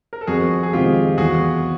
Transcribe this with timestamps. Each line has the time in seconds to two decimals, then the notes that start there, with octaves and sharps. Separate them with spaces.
0.13 A#4
0.21 A4
0.27 F2 F#4 G#4
0.63 G#4
0.73 C3 D#3 G#3 F4 G4
1.18 E2 F#4 G#4